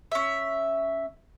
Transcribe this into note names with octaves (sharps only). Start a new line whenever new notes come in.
C#4 E5